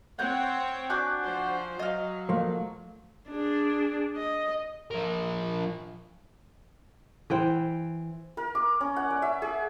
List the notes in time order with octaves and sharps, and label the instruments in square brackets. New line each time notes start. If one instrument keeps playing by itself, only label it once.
[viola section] C4 C#5 G5 [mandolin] F#5 G6
[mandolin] D4 F#4 D6 [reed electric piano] G#5 F#6 G6
[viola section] F3 C5
[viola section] F#3 [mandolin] D#5 F5
[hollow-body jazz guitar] F3 A3 A#3
[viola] D4 G#4
D#5
[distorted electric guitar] F3 A#4
[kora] E3 C5 G5
[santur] A#4
D6
C#4
F#5
D5
E5
G#4